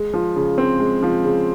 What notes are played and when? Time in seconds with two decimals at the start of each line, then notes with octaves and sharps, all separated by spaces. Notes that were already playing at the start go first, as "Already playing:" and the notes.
Already playing: G#3
0.14 F3
0.36 C#3
0.58 C4
0.80 G#3
1.03 F3
1.24 C#3